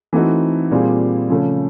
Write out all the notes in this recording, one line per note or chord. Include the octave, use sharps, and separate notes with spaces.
E3 A3 C4 D#4 F#4
A#2 G3 C4 F4 G#4
C#3 F3 A3 C#4